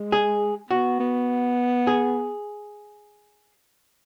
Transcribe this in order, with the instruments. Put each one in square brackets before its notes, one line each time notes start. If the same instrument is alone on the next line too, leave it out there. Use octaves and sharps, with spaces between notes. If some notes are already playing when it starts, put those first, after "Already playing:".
Already playing: [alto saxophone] G#3
[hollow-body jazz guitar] G#4
[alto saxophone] B3 [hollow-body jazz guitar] F#4
[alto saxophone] B3
[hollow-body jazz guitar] G#4